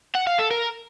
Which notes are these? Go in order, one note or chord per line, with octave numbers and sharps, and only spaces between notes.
F#5
F5
A4
A#4